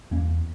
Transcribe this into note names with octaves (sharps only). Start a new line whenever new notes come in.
E2 A#3 C#4